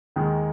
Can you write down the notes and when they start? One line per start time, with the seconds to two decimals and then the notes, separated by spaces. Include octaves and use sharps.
0.16 D#2 D#3 G#3